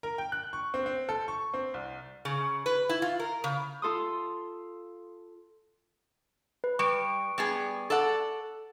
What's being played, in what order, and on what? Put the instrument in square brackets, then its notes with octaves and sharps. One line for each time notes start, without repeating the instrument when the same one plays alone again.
[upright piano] A#4
G5
F#6
C#6
C4
C4
A4
C#6
C4
C2
[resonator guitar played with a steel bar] C#3
B4
E4
F4
A#4
C#3
[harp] F4 A4 C6 D#6
[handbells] B4
[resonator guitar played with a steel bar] G3 [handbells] C#6 D7
[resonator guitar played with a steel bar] G3 B3 G#4
A4 D5 F#5